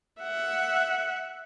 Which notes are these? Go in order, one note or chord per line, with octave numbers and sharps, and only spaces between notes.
E5 F#5